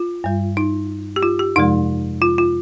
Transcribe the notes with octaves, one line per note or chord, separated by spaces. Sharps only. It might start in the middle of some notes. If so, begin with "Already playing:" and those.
Already playing: F4
G2 G3
D#4
G4
F4
G4
F2 C3 F3 G#3 D#4
F4
F4